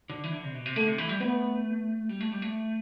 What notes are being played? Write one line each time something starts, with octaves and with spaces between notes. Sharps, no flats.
D3
E3
D3
C3
B2
C3
D3 A3
C3
E3
G3
A3 B3
G3
A3
G3
A3